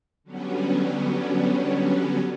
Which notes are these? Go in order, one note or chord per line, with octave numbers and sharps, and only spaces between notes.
D3 F#3 G3 B3 C#4